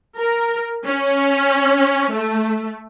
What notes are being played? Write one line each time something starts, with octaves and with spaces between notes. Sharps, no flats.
A#4
C#4
A3